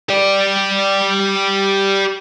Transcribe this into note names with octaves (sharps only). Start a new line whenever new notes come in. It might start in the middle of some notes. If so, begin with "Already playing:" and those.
G4 D5